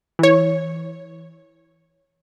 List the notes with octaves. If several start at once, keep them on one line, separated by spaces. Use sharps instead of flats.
E3 C#5